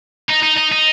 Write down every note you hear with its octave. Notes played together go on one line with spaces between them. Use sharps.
D#4
D#4
D#4
D#4